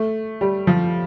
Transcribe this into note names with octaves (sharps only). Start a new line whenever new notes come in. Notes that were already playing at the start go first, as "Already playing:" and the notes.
Already playing: A3
G3
F3